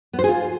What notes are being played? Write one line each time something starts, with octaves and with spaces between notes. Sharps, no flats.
B3
C5
G#4
F4